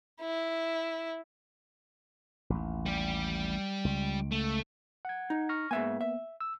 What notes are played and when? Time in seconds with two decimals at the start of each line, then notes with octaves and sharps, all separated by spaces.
0.21 E4
2.50 A1 D#2
2.86 G3 G4
3.85 C#2
4.31 A3
5.05 F#5 G#6
5.30 D#4
5.49 C#6 F6 A#6
5.71 G#2 A#3 B3 E5 G#5
6.01 E5
6.41 E6